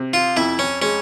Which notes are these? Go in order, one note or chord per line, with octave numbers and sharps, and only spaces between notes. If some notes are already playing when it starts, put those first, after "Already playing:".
Already playing: C3
F4
F2 E4
C#4
G#3 C#4